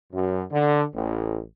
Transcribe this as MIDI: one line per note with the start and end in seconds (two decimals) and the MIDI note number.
0.12 0.41 42
0.51 0.82 50
0.94 1.38 33